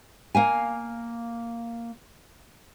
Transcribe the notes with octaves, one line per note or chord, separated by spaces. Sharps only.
A#3 F5 G#5